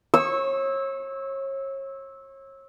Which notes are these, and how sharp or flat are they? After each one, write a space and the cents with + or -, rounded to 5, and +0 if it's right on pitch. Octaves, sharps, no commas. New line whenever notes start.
C#5 -35 C#6 -10 E6 -15